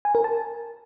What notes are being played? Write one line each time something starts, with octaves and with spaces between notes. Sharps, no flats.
G#5
A#4
A5